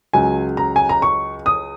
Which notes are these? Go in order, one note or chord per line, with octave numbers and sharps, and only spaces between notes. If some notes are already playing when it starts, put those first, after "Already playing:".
C#2 C#3 F#3 G#5
A#5
G#5
A#5
C#6
D#6